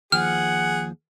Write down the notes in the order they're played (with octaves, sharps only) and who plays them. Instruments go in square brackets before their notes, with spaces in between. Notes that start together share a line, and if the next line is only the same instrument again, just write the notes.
[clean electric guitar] D#2 F3 [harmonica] G#4 [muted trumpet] F#5 [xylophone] F6